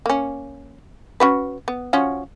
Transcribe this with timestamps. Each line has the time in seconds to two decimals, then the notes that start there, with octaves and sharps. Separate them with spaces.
0.06 A#3 C#4
1.20 C#4 F#4 B4
1.68 B3
1.93 F3 C#4 F#4